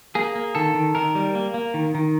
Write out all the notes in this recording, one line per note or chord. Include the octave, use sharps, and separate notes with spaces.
A#3 G#4
A#3
D#3 A4
D#3
D#3 A#4
G3
A#3
A#3
D#3
D#3